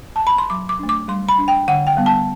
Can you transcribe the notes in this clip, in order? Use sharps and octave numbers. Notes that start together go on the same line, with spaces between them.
A5
B5
C6
F#3 D6
D6
A3 D4
D6
G3 C6
B5
D4
G5
D3 F#5
G5
G3 B3
A5